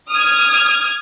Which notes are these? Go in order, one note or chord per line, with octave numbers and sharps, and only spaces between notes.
D#6 F6 G#6